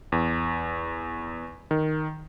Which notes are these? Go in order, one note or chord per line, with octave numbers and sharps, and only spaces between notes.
E2
D#3